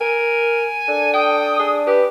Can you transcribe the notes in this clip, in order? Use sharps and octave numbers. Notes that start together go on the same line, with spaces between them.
A#4 G#5
D4 A4
G5 D#6
D4 G#4
G4 B4